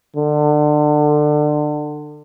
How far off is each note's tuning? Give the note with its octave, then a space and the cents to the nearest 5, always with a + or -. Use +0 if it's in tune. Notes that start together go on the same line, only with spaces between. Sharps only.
D3 +25